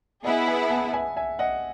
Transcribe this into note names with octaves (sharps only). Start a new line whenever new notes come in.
B3 E4 G#4 D#5 F#5
E5 G#5
F#5 A5
E5 G#5
E5 G#5
D#5 F#5